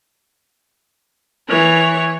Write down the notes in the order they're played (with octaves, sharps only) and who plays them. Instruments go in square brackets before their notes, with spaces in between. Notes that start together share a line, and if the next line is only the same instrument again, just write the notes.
[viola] E3 C#5